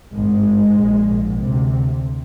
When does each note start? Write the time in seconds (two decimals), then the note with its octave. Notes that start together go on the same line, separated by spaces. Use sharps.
0.12 G#1 G2 G#3
0.76 A#1 G#2
1.39 D2 C3